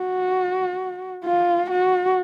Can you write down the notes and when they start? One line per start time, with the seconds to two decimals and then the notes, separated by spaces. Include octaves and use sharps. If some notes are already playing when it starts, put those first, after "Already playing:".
Already playing: F#4
1.24 F4
1.71 F#4